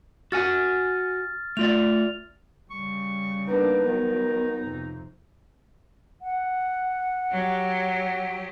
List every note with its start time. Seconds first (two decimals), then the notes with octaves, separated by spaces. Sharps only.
0.32 F#4 F#5 G#5 F6 A6
1.57 A3 F4 D5 F7
2.70 C#3 G3 C#6
3.48 A#3 B3 D4 D#4
3.84 D#3 F#3 B3
4.59 F2 C3
6.21 F#5
7.32 F#3 G4